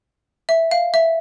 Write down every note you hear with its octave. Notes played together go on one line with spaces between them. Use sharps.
E5
F5
E5